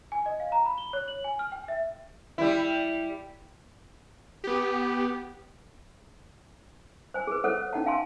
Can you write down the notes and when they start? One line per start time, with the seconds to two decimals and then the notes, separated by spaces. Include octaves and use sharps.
0.12 G#5
0.26 D#5
0.40 F5
0.52 A#5
0.66 B5
0.78 G7
0.93 C#5
1.08 F#7
1.24 G#5
1.39 F6
1.52 G5
1.68 E5
2.38 G3 E4
4.44 B3 G4
7.14 C5 G#5
7.27 G#4 B4
7.44 A4 C5 C#5 F#5
7.73 C#4 D#4 F#5 A5
7.86 F5 G#5 A5 C6